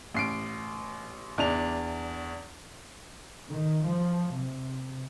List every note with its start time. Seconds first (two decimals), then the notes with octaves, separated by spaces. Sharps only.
0.14 A1 C7 D7
1.38 E2 D4 F7
3.48 D#3
3.83 F3
4.31 C3